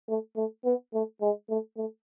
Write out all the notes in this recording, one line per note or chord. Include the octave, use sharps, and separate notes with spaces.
A3
A3
B3
A3
G#3
A3
A3